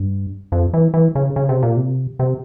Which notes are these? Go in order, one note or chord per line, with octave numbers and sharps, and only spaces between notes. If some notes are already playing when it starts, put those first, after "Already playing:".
Already playing: G2
F2
E3
E3
C#3
C#3
C3
A#2
C3
C3